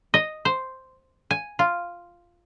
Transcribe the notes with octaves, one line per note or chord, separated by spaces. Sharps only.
D#5
C5
G#5
F4